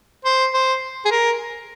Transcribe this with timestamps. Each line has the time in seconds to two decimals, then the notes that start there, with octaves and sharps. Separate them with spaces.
0.25 C5
0.53 C5
1.05 G#4
1.11 A#4